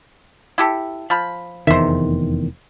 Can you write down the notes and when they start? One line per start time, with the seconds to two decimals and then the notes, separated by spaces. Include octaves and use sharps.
0.58 E4 G4 A4
1.10 F3 B5
1.67 F1 E2 D#3 C5 E5